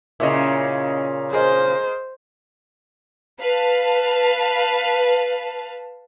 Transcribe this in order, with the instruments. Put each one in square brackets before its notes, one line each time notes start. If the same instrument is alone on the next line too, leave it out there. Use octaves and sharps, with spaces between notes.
[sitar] A#2 C#3 [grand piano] E4 C#5 D#5
[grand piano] G#4 A#4 D#5 [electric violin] C5
[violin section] B4 F5 A5